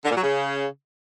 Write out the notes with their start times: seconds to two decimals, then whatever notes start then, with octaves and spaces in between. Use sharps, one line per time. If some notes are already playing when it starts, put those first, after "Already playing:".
0.05 D3
0.11 A#2
0.17 F#3
0.23 C#3